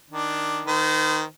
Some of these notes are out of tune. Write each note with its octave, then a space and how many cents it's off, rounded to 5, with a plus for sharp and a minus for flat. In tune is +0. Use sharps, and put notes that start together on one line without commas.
D#3 +0 D4 +5
D#3 +0 C5 -40